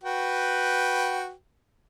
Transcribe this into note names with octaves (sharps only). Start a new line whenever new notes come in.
F#4 B4 G5